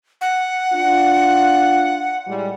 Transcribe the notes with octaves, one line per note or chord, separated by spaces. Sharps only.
F#5
D4 F4
A2 G3 G#3